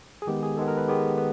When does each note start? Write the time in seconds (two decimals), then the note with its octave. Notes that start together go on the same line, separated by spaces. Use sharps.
0.22 G#4
0.27 D#3 G#3 B3 G4
0.43 G#4
0.57 D#3 G#3 B3 A4
0.68 A#4
0.77 B4
0.87 D#3 G#3 B3 G4
1.17 B3